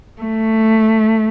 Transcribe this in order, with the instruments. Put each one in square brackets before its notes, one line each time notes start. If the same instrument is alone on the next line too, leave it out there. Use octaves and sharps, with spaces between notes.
[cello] A3